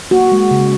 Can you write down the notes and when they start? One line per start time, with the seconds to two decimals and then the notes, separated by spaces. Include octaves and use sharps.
0.11 A#3 F#4
0.32 G#3
0.51 C#3